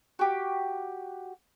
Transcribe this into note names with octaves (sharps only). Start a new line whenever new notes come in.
F#4 G4